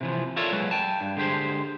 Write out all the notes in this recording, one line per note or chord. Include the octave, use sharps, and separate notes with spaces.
C3 E3 F3
F4 A4 A#4 C#5 D5 E5
F#3 G#3 B4
G5 A5
G2
D3 G#3 G4 C5